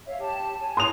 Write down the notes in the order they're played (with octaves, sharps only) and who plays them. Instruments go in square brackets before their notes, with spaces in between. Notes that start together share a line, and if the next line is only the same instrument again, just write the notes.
[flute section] C#5 E5 F5
G4 A5
C#5 G#5
[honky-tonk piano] C6 D#6 F7